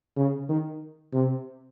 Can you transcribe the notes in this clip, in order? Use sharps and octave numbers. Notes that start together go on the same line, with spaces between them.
C#3
D#3
C3